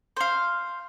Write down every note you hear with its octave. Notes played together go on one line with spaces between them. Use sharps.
C5 F5